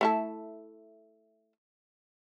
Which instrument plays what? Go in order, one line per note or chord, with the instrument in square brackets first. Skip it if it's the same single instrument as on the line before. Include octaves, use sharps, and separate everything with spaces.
[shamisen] A3 E4 A4